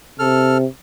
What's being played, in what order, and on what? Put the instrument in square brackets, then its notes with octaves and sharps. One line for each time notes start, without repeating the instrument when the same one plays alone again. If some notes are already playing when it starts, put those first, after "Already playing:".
[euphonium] C3 [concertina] A4 F6